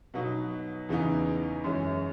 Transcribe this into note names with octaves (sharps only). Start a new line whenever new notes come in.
B2 F#3 B3 D#4
E2 C#3 E3 B3 D#4
F#2 E3 G#3 C#4